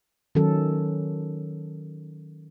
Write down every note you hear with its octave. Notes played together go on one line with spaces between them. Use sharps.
D#3 F#3 C#4 A4